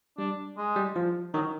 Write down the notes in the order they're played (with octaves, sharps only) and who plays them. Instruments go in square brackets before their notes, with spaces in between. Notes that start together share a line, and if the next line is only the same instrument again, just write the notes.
[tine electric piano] G3 [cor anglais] D4
[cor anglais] G#3
[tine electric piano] G3
F3
[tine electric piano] D#3 [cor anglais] F#3